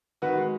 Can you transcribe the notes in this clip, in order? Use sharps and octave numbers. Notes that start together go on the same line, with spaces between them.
D#3 F#4 B4
G#3